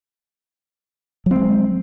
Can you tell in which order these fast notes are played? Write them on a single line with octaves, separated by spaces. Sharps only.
F#3 C4 G#3